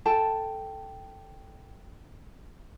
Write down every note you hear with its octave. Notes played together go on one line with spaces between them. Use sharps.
A4 G5 A5